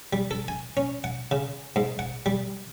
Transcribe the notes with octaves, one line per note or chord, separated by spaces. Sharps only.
G3
A4
G#5
C#4
F#5
C#3
G#2
F#5
G3